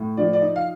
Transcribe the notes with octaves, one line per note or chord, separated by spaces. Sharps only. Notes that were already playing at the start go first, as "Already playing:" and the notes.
Already playing: A2
F3 D5
D5
D#4
F5